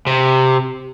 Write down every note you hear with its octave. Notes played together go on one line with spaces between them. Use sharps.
C3